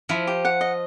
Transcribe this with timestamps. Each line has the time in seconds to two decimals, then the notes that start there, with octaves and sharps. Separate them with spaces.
0.09 F3 E4
0.27 G4
0.45 F#5
0.61 D#5